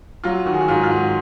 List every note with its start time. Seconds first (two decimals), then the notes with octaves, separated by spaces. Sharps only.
0.24 F#3 F4
0.45 D#3 F#4
0.54 G#4
0.61 F#4
0.68 G#2 F4
0.83 F4
0.90 G#2 F#4